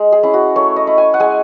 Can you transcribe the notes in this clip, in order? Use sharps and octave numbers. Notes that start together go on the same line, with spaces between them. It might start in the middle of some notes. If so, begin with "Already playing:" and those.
Already playing: G#3
G#4
C#4 E4
F#4
A3 C#5
D#5
E4
G#5
F#5
G#3 G#5